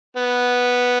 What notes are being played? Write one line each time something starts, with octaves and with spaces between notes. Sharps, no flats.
B3